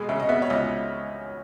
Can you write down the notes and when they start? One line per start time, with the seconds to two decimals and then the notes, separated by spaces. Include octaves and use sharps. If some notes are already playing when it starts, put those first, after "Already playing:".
Already playing: B2 G#3
0.09 C#3 E5
0.20 D#5
0.29 B3 E5
0.42 C#5
0.50 C#2 D#5